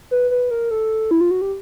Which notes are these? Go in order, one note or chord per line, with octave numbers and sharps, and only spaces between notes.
B4
B4
A#4
A4
E4
F4
F#4
G4